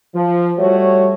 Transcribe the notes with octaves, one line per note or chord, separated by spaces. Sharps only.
F3
G3 A3 F#4 C#5